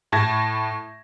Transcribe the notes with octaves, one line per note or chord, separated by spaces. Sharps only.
A2 A5 G#6 A#6